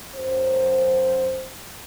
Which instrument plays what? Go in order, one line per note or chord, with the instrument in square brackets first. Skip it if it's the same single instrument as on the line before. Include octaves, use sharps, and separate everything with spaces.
[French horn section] F#2 C5